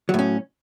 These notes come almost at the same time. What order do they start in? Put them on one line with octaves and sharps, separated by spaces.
F#3 A2 C#4